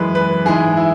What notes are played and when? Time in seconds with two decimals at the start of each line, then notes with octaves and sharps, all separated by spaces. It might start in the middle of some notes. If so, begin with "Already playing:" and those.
Already playing: F#2 E3 G#3 B4
0.15 B4
0.45 G#2 E3 G#3 G#4
0.77 E4